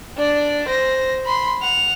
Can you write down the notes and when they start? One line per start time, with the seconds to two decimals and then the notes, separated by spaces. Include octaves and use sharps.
0.17 D4 D5
0.67 C5 A#6
1.26 B5 C6
1.62 F#5 F7